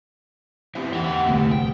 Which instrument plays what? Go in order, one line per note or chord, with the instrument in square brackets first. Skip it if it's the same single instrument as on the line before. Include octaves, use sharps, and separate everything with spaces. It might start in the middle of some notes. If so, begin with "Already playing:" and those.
[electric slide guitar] B3 C4 E4 [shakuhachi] G4
[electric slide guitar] E2 G4 [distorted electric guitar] E3 E5 [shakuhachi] F#5
[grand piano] D1 C2 [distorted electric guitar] A3
[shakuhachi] G#4 [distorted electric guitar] G5